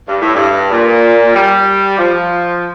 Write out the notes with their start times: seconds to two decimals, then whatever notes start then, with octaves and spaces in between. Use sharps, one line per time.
0.08 G2
0.21 A2
0.35 G2
0.72 A#2
1.35 G3
1.98 F3